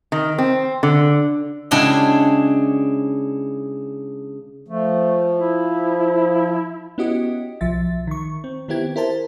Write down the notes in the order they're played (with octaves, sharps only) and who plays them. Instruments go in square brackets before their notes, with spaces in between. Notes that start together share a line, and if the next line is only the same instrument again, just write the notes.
[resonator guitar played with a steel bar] D#3
C4
D3
[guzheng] C#3 G#3 D4 E4 F#4 G4
[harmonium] F3 [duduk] A3
[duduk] E4
[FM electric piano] B3 C#4 E4 F#4 G4 D#5
B1 F3 E5 A6
D#3 C#6
C4
D#3 B3 C4 E4 G4 G#6
E4 A#4 C5 A5